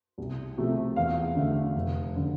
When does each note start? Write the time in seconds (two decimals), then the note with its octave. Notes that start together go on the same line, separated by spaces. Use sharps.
0.18 C2
0.58 C3 F3 A3
0.96 E2 F5
1.35 D3 A3
1.75 F1
2.16 D3